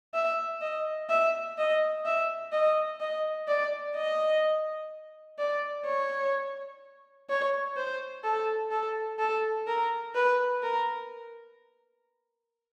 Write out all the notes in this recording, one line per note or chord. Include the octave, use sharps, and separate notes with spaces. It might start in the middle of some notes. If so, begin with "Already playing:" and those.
E5
D#5
E5
D#5
E5
D#5
D#5
D5
D#5
D5
C#5
C#5
C5
A4
A4
A4
A#4
B4
A#4